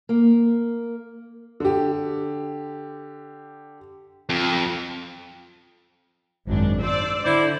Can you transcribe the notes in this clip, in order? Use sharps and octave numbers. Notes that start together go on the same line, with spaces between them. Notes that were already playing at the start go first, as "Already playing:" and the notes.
A#3
D3 G4
F2
G#1 F#2 D4
C5 D5 E6
D3 E4 C5 D5